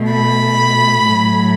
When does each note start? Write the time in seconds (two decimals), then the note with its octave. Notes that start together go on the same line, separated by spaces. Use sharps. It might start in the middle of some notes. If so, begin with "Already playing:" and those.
Already playing: B2 A3
0.11 B5
1.06 A2 F#3 A3